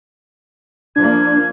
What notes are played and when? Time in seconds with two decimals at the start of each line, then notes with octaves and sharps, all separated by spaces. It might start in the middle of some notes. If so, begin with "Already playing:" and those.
0.96 F3 A#3 D4 G#6